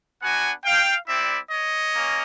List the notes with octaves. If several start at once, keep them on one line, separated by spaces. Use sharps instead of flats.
B3 D4 F#4 F#5 G#5
F5 G5
G3 C4 E4 D5 E5
C#5 D#5
A#3 C#4